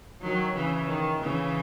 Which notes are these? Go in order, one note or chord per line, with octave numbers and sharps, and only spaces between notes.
D#3 F#3
C#3 E3
D#3
C#3 E3